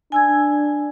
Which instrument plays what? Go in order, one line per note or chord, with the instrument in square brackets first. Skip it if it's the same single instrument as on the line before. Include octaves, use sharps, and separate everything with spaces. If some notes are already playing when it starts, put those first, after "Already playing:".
[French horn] D4 [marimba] G#5 E6 G#6